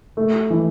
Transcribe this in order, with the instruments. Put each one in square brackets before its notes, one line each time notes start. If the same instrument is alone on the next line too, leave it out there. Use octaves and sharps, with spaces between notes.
[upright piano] A3
E3